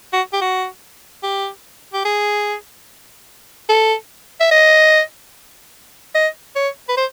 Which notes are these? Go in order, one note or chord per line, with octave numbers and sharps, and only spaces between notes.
F#4
G4
F#4
G4
G4
G#4
A4
E5
D#5
D#5
C#5
B4
C5